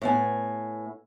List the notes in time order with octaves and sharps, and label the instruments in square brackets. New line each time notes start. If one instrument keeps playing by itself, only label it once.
[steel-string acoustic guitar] A2 B3 G#5